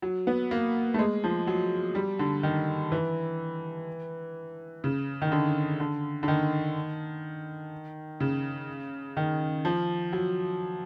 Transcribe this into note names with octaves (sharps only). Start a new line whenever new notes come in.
F#3
B3
A#3
A3
G#3
F3
F#3
G3
D3
D#3
E3
C#3
D#3
D3
D3
D3
D#3
C#3
D#3
F3
F#3